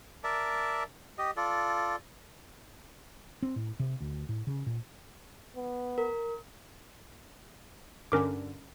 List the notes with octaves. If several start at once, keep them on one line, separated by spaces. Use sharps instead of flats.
A#4 D5 E5 A5
G4 D#5
F4 A4 D5
C4
A2
C3
D2
A2
C#3
A#2
B3
A#4
G2 D3 C#4 A#4 D6